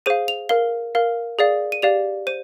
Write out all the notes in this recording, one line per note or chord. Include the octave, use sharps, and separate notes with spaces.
G#4 C5 F5 D#7
F7
A#4 F5 G7
A#4 F5
G#4 D5 F5
D#7
G4 D5 F5 F7
C5 D#7